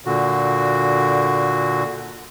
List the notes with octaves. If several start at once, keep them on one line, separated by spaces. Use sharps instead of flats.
A#2 D3 F#4